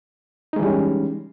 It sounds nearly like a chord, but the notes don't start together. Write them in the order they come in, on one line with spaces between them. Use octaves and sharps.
D#4 G#3 E3 G3 C#4